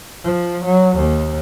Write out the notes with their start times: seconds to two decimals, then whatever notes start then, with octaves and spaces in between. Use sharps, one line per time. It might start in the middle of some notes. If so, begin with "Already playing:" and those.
0.24 F3
0.65 F#3
0.96 D#2